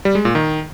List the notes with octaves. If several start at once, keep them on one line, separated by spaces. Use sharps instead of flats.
G3
G#3
A#2
D#3